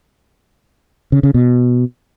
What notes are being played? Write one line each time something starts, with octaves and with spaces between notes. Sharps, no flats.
C#3
C#3
B2